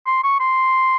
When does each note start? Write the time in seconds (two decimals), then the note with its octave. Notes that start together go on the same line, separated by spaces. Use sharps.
0.06 C6
0.24 C#6
0.40 C6